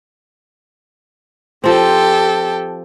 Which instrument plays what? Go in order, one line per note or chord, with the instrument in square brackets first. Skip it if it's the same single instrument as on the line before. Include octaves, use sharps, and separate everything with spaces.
[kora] F3 C4 [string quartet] G4 A4 G5